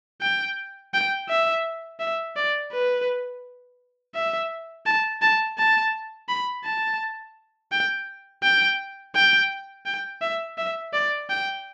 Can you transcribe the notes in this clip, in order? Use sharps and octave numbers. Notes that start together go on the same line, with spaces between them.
G5
G5
E5
E5
D5
B4
E5
A5
A5
A5
B5
A5
G5
G5
G5
G5
E5
E5
D5
G5